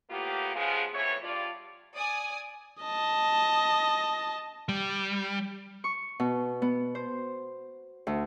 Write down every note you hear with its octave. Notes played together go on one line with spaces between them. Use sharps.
A2 A#3 B3 F4 G4
C#3 F3 G#3 B3 F4 G#4
F2 E3 A3 B3 C#5
G2 F4 D5
D5 G#5 D#6
D#5 A5
G3
C#6
B2
B3
C5
D2